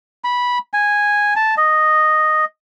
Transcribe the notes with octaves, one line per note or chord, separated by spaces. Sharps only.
B5
G#5
A5
D#5